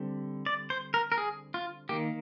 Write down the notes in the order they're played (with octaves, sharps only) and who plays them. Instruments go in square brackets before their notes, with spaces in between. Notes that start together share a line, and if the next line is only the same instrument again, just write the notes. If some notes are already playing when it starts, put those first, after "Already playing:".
Already playing: [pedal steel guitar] D3 G3 C4
D5
C5
A#4
A#4
G#4
F4
D#3 A#3 G4